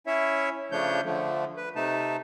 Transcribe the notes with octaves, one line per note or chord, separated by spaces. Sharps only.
C#4 E4 C#5 E5
C#3 F3 A3 D4 C#5 G6
D3 F3 A3
B4
C3 A3 D#4 A5